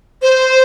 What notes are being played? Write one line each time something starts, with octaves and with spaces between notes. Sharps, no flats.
C5